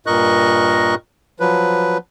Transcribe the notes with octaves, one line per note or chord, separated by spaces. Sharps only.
G2 A#2 A#4 D#5 C#6 F#6
F3 F#3 B4